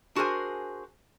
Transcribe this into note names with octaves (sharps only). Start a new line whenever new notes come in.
D4 F#4 G#4 A#4 C5 G#5